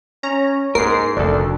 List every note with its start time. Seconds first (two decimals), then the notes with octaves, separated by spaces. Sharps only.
0.23 C#4 A#5
0.75 G#2 A#3 A#4 C7
1.17 F1 D2 F3 D4 A4